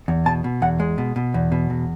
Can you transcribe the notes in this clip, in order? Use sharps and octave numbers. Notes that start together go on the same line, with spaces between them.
E2
B2 A5
B2
E2 F#5
G#3
B2
B2
E2
B2
E2